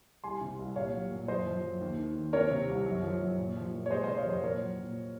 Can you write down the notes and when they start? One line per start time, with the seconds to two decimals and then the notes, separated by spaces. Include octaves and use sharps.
0.24 C2 G#5 C6
0.41 C3
0.59 C2
0.76 A#2 C#5 F5
0.93 F#3
1.11 A#2
1.28 F#2 C5 D#5
1.46 F3
1.64 F#2
1.81 D#2
1.98 D#3
2.15 D#2
2.33 C4 A#4 C#5
2.51 C3
2.68 C2
2.86 F#2
3.03 F3
3.21 F#2
3.38 A#2
3.56 F3
3.74 A#2
3.86 C#5
3.90 G#3 C5 D#5
4.04 C3 C5 D#5
4.17 C#5 F5
4.26 F2 C5 D#5
4.44 A#2 A#4 C#5
4.61 F#3
4.79 A#2